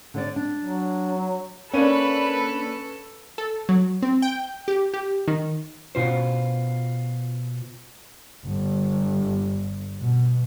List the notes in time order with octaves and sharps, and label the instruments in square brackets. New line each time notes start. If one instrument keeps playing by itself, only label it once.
[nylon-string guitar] D3 C#5 D5
D4
[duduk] F#3
[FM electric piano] A#3 D4 [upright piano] C#4 D#7 [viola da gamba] A4 [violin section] B4
[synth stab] A4
F#3
C4
G5
G4
G4
D#3
[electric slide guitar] B2 F4 C5
[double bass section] G1
B2